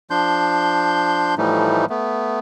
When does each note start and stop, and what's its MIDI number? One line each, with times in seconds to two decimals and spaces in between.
0.10 1.35 53
0.10 1.35 62
0.10 1.35 84
0.10 1.35 91
1.38 1.85 45
1.38 1.85 52
1.38 1.85 53
1.38 1.85 55
1.38 1.85 57
1.38 1.85 63
1.90 2.39 57
1.90 2.39 59